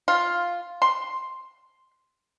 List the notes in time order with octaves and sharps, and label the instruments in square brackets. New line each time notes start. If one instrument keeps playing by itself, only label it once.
[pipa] F4
C6